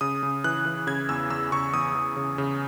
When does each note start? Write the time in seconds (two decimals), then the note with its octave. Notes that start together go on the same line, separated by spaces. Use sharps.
0.01 C#3 D#6
0.23 C#3
0.44 E3 F#6
0.66 E3
0.87 C#3 G#6
1.09 E2 E6
1.30 E2 E6
1.52 C#3 C#6
1.73 E2 D#6
1.95 E2
2.16 C#3
2.38 C#3